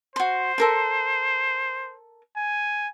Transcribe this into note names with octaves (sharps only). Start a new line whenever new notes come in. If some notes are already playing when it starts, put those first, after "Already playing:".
F#4 C5 C6
A4 A#4 C6
G#5